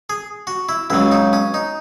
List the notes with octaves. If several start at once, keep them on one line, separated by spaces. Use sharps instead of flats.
G#4
F#4
E4
C#2 C#3 F#3 E4
D#4
C#4
D#4